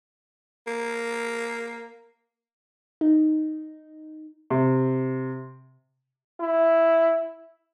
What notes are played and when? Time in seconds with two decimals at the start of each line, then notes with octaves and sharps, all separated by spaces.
0.67 A#3
3.01 D#4
4.50 C3
6.40 E4